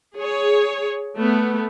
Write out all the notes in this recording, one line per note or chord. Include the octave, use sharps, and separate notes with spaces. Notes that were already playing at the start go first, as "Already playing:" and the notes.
G#4 C#5
A3 B3